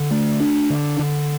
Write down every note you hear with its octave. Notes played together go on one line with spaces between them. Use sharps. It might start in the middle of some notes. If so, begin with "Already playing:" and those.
Already playing: D3
A3
D4
D3
D3